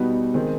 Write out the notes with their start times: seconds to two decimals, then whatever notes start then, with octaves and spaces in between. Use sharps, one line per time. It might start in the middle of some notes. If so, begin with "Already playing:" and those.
Already playing: B2 G3 B3 D#4 F#4
0.33 D#3 G#3 C4